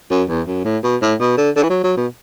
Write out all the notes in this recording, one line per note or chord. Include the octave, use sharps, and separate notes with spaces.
F#2
E2
F#2
A2
B2
A2
B2
D3
D3
E3
F#3
F#3
B2